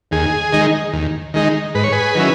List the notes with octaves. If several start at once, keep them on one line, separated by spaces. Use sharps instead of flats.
D#2 G#4
D#3 G#3 D#4
D#2
D#3 G#3 D#4
G#2 B4
C#5
G#4 B4
D#3 F#3 C#4 E4